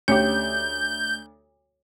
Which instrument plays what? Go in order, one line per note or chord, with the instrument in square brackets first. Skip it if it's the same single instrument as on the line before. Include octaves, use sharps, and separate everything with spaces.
[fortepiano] D2 [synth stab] C#4 G4 [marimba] C#5 [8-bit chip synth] G6